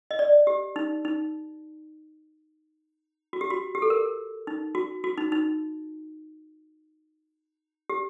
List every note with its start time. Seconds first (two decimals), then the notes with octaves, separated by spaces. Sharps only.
0.11 D#5
0.19 D5
0.47 G4
0.76 D#4
1.05 D#4
3.33 F#4
3.41 G4
3.50 F#4
3.75 G4
3.82 A4
3.90 A#4
4.47 D#4
4.75 F#4
5.04 F#4
5.18 D#4
5.32 D#4
7.89 G4